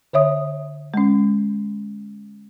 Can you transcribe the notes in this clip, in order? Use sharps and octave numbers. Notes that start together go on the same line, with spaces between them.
D3 C#5 E5 D#6
G#3 C#4